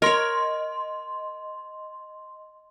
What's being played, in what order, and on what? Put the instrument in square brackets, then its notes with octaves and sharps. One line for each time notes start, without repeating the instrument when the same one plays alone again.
[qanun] A#4 C#5 [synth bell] D#5 C6